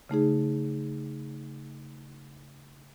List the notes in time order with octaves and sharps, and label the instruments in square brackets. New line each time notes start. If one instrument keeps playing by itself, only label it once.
[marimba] C#3 A3 D#4 G#4